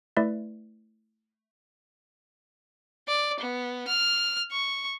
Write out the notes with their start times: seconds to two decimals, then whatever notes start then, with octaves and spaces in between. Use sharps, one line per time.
0.17 A3 E4 B4 D5 E5
3.08 D5
3.40 B3
3.87 F6
4.52 C#6